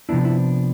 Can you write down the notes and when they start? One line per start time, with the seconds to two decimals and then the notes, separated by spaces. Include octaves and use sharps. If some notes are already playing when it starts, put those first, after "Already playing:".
0.09 C3 F3 B3 D4 E4
0.25 E4